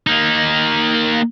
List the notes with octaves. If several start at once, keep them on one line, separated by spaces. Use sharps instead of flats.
A#3 D#4